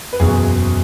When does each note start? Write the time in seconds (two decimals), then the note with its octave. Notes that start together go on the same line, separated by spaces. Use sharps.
0.13 B4
0.20 F#1 E2 B2 F#3 G#4